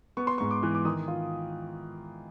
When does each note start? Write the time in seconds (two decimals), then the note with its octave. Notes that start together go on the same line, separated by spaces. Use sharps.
0.17 B3 C#6
0.27 C6
0.38 G#2 C#6
0.51 D6
0.63 E3
0.75 D6
0.85 D#3 D#6
1.08 F4